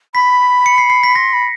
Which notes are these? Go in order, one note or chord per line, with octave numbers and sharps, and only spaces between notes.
B5 B6
C#7
C7
C7
B6
C6 A#6
B5